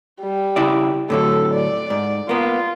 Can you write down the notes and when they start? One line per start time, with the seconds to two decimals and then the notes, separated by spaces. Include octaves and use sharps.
0.21 G3
0.56 C#3 E4 D5
1.10 A2 D3 F#3 A4
1.54 D5
1.90 G#2
2.29 A#3 B3 F4